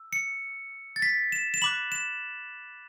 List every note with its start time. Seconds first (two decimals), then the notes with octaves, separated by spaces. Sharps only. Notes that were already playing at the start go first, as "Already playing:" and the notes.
Already playing: E6
0.13 C#7
0.96 A6
1.02 B6
1.32 E7
1.54 E7
1.62 B5 D6 F#6 F#7
1.92 E7